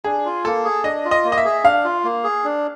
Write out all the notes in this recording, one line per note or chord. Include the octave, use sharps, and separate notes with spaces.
D4 G#4
F4
A#3 A4
G#4
D4 D#5
F4
D#5
A#3
D#5
E5
G#4
D4 F5
F4
A#3
G#4
D4